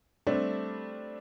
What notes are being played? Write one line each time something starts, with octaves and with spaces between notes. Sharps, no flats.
G3 A3 C4 D4